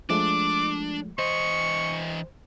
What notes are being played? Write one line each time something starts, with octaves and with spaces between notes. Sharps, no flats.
F3 G#3 A3 D4 D6
E3 C5 D#5 C#6